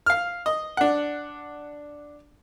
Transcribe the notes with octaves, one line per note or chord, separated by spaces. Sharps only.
F5 F6
D#5
D4 F#5